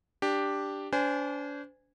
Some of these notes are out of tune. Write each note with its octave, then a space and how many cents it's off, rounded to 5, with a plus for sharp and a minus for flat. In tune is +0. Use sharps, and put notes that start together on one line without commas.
D4 +0 G4 +0
D4 -40 C5 -35 G#5 -15